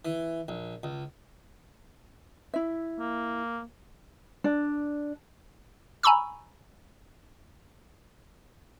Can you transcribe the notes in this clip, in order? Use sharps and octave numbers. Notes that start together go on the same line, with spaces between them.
E3
A#1
C#2
E4 E5
A#3
D4
G#5 A#5 B5 C#6 E6